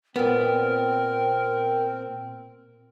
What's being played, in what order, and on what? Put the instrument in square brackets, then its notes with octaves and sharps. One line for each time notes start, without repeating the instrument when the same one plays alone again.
[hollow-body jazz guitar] A#2 B3 [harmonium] C4 [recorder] A#4